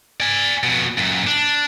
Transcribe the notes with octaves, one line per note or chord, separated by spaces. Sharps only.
D5 G#5
F2 B2
F#2 A#2
D4